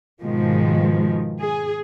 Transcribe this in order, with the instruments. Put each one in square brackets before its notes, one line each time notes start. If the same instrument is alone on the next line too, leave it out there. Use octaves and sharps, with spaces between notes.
[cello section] G#2 B2 D#3 F3 G#3
G#4